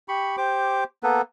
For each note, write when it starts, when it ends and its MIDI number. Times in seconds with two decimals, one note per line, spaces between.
0.08 0.36 67
0.08 0.36 83
0.08 0.36 85
0.37 0.84 67
0.37 0.84 72
0.37 0.84 86
1.03 1.21 58
1.03 1.21 59
1.03 1.21 69
1.03 1.21 71